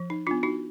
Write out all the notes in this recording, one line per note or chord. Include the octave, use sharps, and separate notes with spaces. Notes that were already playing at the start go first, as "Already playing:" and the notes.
Already playing: F3
D#4
B3 D4 F4
D#4 F#4